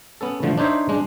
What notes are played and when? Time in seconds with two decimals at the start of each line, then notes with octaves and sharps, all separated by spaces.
0.21 B3 C#4 A4
0.42 A2 D3 F3 A3
0.58 D4 D#4 C5 C#5 E5
0.89 G#3 D4